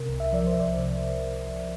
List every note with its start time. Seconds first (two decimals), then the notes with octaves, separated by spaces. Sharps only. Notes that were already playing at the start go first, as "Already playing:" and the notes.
Already playing: C3 A#4
0.09 C2
0.20 E5
0.33 F3 D5
0.47 C5
0.55 C2
0.60 D5
0.78 C3